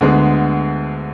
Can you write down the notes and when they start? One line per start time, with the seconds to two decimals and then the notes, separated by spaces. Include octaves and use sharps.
0.01 D2 D3 G#3 B3